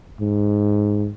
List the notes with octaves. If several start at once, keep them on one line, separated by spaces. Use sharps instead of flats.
G#2